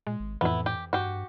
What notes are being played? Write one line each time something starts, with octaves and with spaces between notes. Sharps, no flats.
A#2 G#3
G#1
F2 A2 E3 B3 E4
G4
G2 F#4 G4